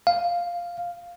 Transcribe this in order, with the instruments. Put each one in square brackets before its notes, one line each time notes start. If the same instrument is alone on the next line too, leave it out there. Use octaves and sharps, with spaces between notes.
[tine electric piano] F5